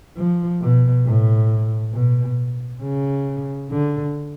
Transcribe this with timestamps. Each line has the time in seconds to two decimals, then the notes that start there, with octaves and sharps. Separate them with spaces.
0.17 F3
0.61 B2
1.06 A2
1.93 B2
2.82 C#3
3.70 D3